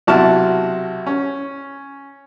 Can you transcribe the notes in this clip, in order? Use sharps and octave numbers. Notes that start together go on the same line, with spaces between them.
B1 C3 E4 F#4 A5 F6
C#4